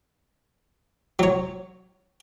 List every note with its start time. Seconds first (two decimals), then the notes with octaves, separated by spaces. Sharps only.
1.19 F#3 C#5